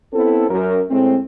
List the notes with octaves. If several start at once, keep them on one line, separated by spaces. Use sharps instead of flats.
B3 C4 E4 A4
F#2 A#4
A2 G#3 A3 C4